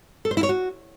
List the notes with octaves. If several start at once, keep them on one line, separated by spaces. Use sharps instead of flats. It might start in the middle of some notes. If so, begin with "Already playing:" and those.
A4
C5
E4
C#5
F#4